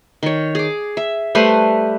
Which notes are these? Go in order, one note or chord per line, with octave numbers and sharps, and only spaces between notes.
D#3 C#5
G#4 D6
E5
G3 A3 B4 C5